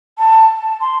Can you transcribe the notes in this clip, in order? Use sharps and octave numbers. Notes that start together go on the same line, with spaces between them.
A5
A5
C6